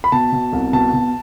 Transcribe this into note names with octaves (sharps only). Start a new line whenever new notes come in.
B5
B2 A5
B2
C2
B2 A5
B2